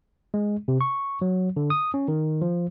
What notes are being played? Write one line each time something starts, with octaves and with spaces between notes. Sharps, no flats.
G#3
C3
C#6
F#3
D3
D#6
C#4
D#3
F3